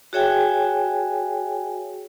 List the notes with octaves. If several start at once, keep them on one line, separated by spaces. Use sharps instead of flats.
F#4 G#4 C#5 E5 G5 G#5